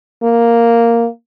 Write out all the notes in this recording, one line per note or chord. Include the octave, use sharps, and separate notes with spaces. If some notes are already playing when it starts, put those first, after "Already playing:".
A#3